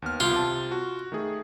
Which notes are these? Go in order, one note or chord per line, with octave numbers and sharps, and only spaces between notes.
D#2 B3 F6
C2 F4
C3 A5
F#4
D#3 A3 G#4